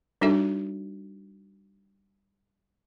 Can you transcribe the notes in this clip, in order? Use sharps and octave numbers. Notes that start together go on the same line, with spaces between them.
G3 D4 D#4 F#4 A4 E5